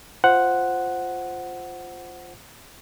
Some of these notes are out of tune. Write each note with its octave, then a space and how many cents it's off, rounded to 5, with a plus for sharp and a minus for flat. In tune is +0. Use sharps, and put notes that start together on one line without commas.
F4 +0 C5 +0 F#5 +0